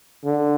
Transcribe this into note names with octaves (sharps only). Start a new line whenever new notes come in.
D3